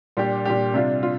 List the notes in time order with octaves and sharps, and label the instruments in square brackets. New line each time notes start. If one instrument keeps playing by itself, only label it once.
[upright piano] A#2 G3 D4 G4
A#2 G3 D4 G4
C3 G3 D4 F4
F4